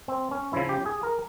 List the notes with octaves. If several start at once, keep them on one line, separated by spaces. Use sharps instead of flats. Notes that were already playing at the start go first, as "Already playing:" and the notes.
C4
C#4
C#3 F3 E4
G4
G#4
A#4